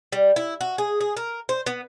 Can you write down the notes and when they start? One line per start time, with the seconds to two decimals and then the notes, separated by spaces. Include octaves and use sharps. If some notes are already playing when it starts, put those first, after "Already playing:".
0.12 G3
0.36 E4
0.61 F#4
0.78 G#4
1.00 G#4
1.17 A#4
1.49 C5
1.66 B3